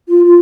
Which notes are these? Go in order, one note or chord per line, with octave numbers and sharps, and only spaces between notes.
F4
F4